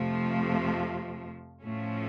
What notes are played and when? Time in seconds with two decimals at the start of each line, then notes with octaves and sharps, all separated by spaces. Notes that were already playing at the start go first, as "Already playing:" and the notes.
Already playing: F2 C3 F3 A3
1.61 A2 F3 A3 C#4